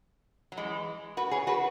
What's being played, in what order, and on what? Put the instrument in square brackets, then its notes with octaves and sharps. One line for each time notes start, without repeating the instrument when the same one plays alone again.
[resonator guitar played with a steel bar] F#3
E3 G#3
F#4 B4
G#4 C#5
F#4 B4